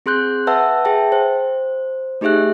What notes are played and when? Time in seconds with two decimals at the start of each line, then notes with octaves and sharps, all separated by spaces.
0.06 C4 G#4 C6 F#6 G6
0.47 B4 E5 F#5 A5 E6
0.85 G#4 E5 G5 A5
1.12 C5
2.21 A3 D#4 G4 G#4 E5 F#6